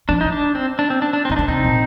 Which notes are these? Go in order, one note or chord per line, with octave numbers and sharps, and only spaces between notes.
F3 D4
D#3 D#4
D4
C4
D4
C4
D4
D4
C4
D#3 D#4
D3 D4
C3 C4 D#4
A#2